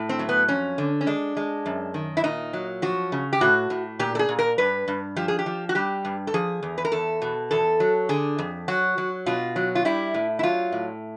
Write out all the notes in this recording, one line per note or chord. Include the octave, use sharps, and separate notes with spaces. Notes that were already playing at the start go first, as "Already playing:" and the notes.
Already playing: A2
C4
F#3
B3
F2 C#4
D3
C#4
G#3 D4
G#3
F#2
D#3
E4
A#2 D#4
F#3
F3 F#4
C#3
G4
A2 F#4
A2
A#2 G4
A4
G#4
A#2
A#4
G2 B4
G2
F3 G4
G#4
G4
F3
F#4
G3 G4
G2
A4
F3 G#4
E2
B4
A#4
E2 A4
B2
E2 A4
F#3
D3 G#4
F2
F#3 F#4
F#3
B2 F4
F#3
F4
G3 E4
A2
E4
F#3 F4
A2